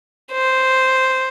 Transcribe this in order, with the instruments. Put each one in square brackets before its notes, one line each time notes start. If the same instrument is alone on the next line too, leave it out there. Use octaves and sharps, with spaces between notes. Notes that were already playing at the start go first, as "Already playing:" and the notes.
[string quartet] C5